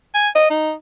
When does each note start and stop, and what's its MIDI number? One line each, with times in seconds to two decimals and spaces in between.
0.14 0.29 80
0.35 0.50 75
0.50 0.73 63